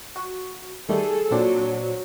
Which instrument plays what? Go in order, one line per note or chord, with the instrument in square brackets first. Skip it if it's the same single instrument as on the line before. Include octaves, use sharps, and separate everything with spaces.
[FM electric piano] F#4
[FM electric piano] D#3 G3 A3 [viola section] G#4 A4
[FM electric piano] A#2 C4 D4 [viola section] F#3